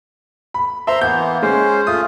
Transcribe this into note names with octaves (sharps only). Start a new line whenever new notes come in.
B5
C5 E5 A#5 C6
E3 A#3 B3 G6
G#3 C#4 C5
A3 F4 D#6